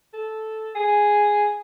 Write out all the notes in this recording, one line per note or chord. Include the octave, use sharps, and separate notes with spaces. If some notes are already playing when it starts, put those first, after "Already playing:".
A4
G#4